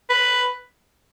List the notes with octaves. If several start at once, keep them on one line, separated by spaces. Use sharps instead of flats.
B4